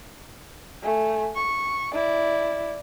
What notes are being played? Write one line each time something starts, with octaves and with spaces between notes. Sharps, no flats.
A3 G#5
C#6
E4 D5